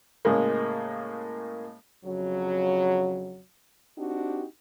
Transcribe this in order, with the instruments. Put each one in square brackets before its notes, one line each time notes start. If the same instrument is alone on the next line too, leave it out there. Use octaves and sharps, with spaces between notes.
[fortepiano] A2 C#3 G#3 A#3
[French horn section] F2 C#3 F#3
C4 D4 D#4 F#4 G4